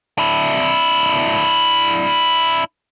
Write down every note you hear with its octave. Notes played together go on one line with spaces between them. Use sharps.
D4 E4